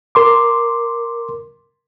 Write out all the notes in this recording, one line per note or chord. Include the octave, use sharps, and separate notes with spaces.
A#4 C6 D6